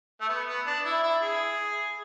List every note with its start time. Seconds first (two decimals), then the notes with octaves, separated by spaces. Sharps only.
0.21 A3
0.29 B3
0.48 B3
0.66 D4
0.85 E4
1.03 E4
1.22 G#4